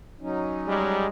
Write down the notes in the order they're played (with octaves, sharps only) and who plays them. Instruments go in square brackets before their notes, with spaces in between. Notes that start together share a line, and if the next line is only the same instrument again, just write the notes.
[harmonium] F#3 C#4 D#4
[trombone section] G3 G#3